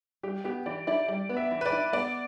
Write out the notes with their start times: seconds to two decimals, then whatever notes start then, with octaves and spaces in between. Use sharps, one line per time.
0.23 G3 G4
0.44 B3 G4
0.66 E3 D5
0.87 E4 D5
1.08 G3 D5
1.29 B3
1.37 E5
1.51 E3
1.61 B4
1.66 D5
1.72 E4
1.93 B3 D5